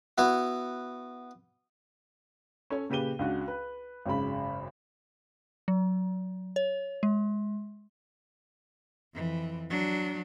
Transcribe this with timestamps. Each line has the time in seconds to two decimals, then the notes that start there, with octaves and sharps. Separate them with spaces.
0.18 B3 E4 F#4
2.70 C#4 A4 C#5
2.90 A#2 C#3 G4 B4 D#7 G7
3.19 C#2 D4 F#4
3.48 B4
4.06 G#1 F#2 C#3 B5
5.68 F#3
6.56 C#5
7.03 G#3
9.15 F2 E3
9.70 F#3 D4